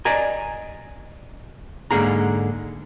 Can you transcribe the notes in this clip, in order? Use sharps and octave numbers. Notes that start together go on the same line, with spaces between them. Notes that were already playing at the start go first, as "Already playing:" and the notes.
D5 D#5 G#5 A#5
G#2 D3 A#3 G#4 A#5